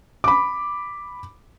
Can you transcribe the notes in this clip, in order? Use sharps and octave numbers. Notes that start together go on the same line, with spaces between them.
B5 D6